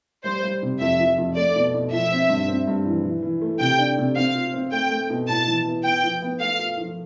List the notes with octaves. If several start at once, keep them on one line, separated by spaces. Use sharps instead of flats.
G3 C5
G3
C3
F2 E5
F3
F2
A3 D5
B2
B2
F3 E5
C4
G2
C4
G2
E3
E3
E3
A3
C3 G5
D4
C3
C4 F5
F4
C4
A3 G5
A3
B2
A2 A5
E3
B3
B3 G5
F3
B3
A3 F5
F4
F3